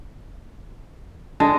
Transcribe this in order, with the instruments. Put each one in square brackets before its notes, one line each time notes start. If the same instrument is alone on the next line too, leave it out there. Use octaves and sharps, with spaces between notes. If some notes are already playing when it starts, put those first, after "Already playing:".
[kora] G#3 [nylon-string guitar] D4 A4 [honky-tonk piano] A5